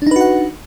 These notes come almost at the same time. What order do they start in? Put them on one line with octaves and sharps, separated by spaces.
D4 D#4 B4 F#4 F#5